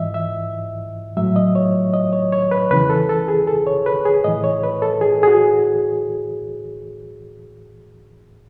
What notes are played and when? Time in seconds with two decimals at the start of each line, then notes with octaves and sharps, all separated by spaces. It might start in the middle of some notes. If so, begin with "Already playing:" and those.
Already playing: G#2 E3 D#5 E5
0.14 E5
1.17 A2 F#3 E5
1.36 D#5
1.55 C#5
1.93 D#5
2.13 C#5
2.32 C#5
2.51 B4
2.71 E2 C#3 E3 B4
2.90 A4
3.09 A4
3.28 G#4
3.47 A4
3.67 C#5
3.86 B4
4.05 G#4
4.24 A2 E3 D#5
4.44 C#5
4.63 B4
4.82 A4
5.01 G#4
5.23 G#4
5.27 F#4